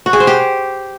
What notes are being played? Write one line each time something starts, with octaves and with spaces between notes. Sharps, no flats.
F#4
G#4
C5
G4